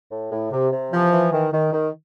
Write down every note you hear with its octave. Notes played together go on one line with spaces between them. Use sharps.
A2
A2
C3
C3
E3 F3
E3
D#3
D#3
D#3